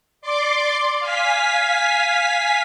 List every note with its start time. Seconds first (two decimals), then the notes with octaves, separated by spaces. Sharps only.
0.21 D5 C6 D6
0.99 F5 G#5 B6